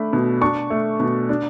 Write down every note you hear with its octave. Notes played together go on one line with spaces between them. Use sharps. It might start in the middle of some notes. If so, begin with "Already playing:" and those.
Already playing: A3 D4 B5
B2
D4 A5 C#6
A3
B2
D4